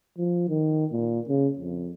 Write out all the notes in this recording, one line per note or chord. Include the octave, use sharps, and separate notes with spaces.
F3
D#3
A#2
C#3
F2